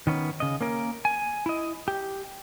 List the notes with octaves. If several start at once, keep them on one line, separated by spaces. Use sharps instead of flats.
D#3 B3 C#4
C#3 D#5
A#3 C#4 A#4
G#5
E4 D#5
G4